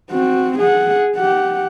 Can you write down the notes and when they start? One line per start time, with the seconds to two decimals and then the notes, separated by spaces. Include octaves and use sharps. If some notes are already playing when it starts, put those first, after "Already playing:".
0.10 C4 F#4
0.59 G#4 F#5
1.16 G4 F#5